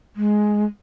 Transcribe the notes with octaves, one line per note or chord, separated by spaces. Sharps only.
G#3